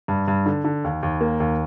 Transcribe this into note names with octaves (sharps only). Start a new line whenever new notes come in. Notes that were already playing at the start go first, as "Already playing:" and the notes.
G2
G2
D3
D3
D#2
D#2
A#3
D#2